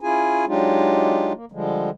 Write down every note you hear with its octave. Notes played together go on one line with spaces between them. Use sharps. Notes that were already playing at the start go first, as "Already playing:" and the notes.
C#4 E4 F4 G#4 G#5
F#3 G#3 D4 D#4 F4 G4
A#3
D3 F3 G3 G#3